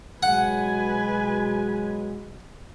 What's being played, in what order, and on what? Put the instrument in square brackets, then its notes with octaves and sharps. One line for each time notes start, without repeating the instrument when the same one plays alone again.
[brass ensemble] B2 F#3 G#3 [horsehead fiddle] B4 G#5 [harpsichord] F#5